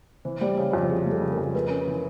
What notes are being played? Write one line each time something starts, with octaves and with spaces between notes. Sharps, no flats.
E3 C5
G3 C5 D5
C#3 C#5
F2
E3 G#4
G3
A4
C#3
A#4
F2
G#3 B4
C#4 A#4
E3